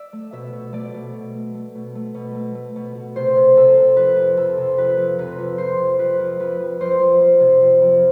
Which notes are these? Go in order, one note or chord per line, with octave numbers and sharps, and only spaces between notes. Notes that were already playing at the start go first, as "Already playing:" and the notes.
Already playing: D5 E5
A3
B2 E5
B2
A3 D5
B2
B2
A3
A3
B2
A3
B2
A3
A3
B2
B2
C3 C5
C3
C3 A4
C3
F2 B4
F2
C3 A4
C3
F2 B4
F2
C3 B4
F2
F2 C5
C3
F2 B4
F2
F2 B4
F2
F2 C5
F2
F2
C3
F2
F2